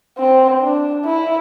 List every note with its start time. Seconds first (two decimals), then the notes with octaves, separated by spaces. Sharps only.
0.18 C4
0.62 D4
1.05 E4